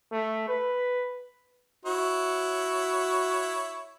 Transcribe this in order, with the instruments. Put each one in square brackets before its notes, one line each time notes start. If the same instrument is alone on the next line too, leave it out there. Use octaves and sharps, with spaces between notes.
[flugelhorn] A3
B4
[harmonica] E4 C#5 [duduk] F#4